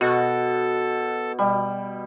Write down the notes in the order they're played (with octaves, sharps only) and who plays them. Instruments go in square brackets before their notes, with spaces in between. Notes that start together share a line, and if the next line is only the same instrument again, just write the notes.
[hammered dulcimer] B2 [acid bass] F#4 [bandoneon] A4
[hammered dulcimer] B2 G3